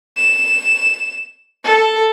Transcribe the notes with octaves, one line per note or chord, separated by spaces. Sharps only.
E7
A4